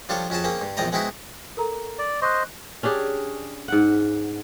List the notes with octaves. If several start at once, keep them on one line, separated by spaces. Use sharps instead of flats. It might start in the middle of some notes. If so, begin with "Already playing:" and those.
F3 G3 D4 F4 A4 C#5
F2 C#4 F#4 G#4 A5
A#3 C4 C#4 G#4
G2
A#1 E2 C4 D5 D#5 A#5
G#3 B3 C4 D#4 E4 F#4
A4 A#4 A#5
D5
C5 D#5 C#6 D6 F#6
C#4 D4 G4 G#4
G#2 F#5